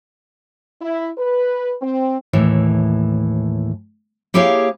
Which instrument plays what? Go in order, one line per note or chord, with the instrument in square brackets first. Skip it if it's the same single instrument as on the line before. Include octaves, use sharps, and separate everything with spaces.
[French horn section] E4
B4
C4
[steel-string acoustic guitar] D#2 A2 E3
A#3 E4 G4 G#4 C#5 F5